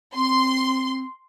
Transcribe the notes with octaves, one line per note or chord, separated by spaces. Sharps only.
C4 C6